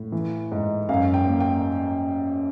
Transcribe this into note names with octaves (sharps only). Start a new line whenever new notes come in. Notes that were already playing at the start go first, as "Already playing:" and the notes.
Already playing: A2
E3
G#2
F#2 F5
G5
A#3
G5